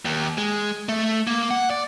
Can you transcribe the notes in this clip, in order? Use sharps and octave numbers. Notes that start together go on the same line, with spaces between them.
D#2
G#3
A3
A#3
F#5
D5